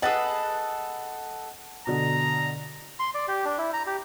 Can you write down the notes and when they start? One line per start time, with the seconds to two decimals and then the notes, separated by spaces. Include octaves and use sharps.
0.02 G#4 A4 B4 D#5 F#5 A6
1.87 B2 D3 A#5
3.00 C6
3.15 D5
3.28 G4
3.45 D4
3.58 E4
3.73 A#5
3.86 G4